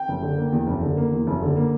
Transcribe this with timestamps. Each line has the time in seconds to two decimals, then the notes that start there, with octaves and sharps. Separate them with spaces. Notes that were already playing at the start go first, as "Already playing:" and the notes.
Already playing: G5
0.08 F#1
0.22 D3
0.37 A#3
0.52 E2
0.67 F#1
0.82 D3
0.97 A#3
1.12 E2
1.27 F#1
1.42 D3
1.56 A#3